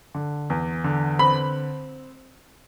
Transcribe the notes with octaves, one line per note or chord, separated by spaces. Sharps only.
D3
E2
D3
C4 B5